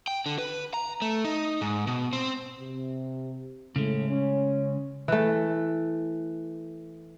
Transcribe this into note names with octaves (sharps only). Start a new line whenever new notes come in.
G5
D3
B4
A#5
A3
D#4
G#2
B2
C4
C3
A2 C#3 G#3
C#4
E3 A3